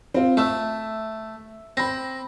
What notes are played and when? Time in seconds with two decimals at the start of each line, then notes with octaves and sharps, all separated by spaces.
0.14 C4 F4
0.37 A3 E5 E6
1.77 C4 B5 A#6